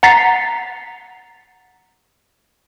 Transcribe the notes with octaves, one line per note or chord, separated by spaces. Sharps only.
F#5 A#5 A6 B6 C7